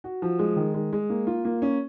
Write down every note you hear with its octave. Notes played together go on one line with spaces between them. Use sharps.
F#4
F3
G#3
D#3
G#3
G#3
A#3
F4
A#3
C#4